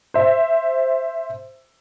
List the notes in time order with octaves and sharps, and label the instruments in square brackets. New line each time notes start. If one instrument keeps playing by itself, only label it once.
[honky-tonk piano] C5 E5